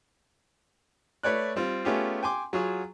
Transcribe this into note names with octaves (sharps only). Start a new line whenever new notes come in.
A3 B4 C#5 D5 F#6
G3 C4 F4
A3 B3 C#4 F4 G4 G#4
G5 G#5 C6 D6
F#3 F4 F#4 G#4